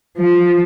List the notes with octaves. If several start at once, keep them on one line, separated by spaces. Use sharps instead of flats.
F3